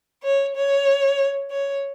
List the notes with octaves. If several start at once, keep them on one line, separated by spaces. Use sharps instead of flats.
C#5
C#5
C#5